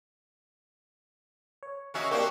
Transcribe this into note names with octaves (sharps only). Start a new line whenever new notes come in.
C#5
A#3 C#4 F#4 D#5 E5 C#6
A#3 C4 D4 F#4 G4